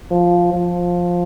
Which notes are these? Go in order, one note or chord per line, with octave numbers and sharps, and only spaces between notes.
F3
F3